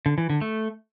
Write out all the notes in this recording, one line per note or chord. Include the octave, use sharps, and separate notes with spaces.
D3
E3
D3
A3